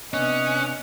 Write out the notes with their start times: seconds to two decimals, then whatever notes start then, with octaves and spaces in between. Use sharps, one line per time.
0.14 C3 B3 C#4 D4 D#5 F#5